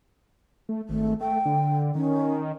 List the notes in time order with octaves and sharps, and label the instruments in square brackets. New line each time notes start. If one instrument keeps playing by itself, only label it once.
[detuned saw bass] A3
[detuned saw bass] G#1 [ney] A3
[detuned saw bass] A3 [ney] G5
[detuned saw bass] D3
[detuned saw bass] D#3 [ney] C#4